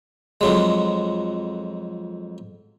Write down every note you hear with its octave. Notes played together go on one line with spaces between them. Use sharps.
F2 F#3 G#3